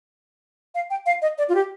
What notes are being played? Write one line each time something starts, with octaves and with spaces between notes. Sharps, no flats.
F5
G5
F5
D#5
D5
F4
G4